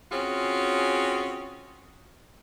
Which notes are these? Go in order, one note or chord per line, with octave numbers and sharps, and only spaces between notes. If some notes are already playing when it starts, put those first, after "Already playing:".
C4 C#4 F4 F#4 G#4